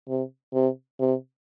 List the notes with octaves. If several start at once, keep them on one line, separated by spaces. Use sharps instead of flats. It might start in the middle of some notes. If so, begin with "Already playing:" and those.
C3
C3
C3